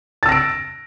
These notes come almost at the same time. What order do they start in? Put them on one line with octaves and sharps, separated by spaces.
A6 E6 A#6 D7